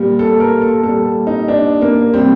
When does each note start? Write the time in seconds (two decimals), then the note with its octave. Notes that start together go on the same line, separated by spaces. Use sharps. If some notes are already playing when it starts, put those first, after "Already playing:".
Already playing: A#2 G3
0.19 A4
0.40 A#4
0.62 A4
0.83 A#2 G3 A4
1.27 D#4
1.48 D4
1.82 A#3
2.13 C3 G3 C4